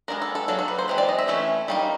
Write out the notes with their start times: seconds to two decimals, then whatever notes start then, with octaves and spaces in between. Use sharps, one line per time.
0.08 G#3 B3 D4 A#4
0.22 A4
0.35 A4
0.48 F#3 A#3 D4 A4
0.59 A4
0.68 B4
0.78 C5
0.88 E3 G#3 C4
0.98 D5
1.09 D#5
1.19 E5
1.28 E3 A3 C#4
1.68 G3 A#3 D#4